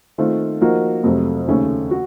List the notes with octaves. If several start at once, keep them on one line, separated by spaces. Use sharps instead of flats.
D#3 A3 C4 F4
F3 A#3 D#4 F#4 A#4
F2 C3 F#3 A3
D#2 C#3 A3 C#4
F#4